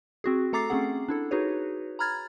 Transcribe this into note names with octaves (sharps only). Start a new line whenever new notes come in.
C4 F#4 G#4
A3 A4 A#5 D6 A6 C7
A3 C4 C#4 G#4 F#5
D4 E4 A4
D#4 F#4 G#4 B4 C#5
A#5 B5 F6 G#6 A6